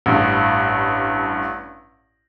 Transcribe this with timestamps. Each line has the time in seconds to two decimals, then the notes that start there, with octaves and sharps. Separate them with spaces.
0.06 A1 G2